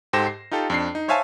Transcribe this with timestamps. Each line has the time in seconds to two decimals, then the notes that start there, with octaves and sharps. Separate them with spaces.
0.13 G#2 G4 A4 C5 A#6 E7
0.27 C7
0.51 D#4 F4 G4 A4
0.70 F2 D4 C7
0.95 D#4
1.08 C5 C#5 E5 F5 G#5 A5